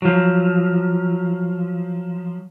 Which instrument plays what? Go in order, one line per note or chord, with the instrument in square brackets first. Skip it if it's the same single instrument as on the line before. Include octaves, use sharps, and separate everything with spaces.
[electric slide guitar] F3 F#3